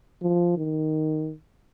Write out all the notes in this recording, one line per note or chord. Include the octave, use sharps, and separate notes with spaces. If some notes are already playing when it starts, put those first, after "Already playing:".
F3
D#3